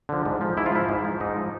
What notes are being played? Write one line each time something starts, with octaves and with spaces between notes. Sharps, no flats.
D3 F3
G#2
F3
G#2 E4
F4
F3 E4
G#2
F3
G#2 D#4
F3